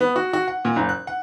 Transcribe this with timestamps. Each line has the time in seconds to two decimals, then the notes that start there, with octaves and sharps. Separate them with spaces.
0.01 B3
0.16 F#4
0.33 F#4
0.48 F#5
0.65 A#2
0.76 F#1
0.89 F#6
1.07 F#5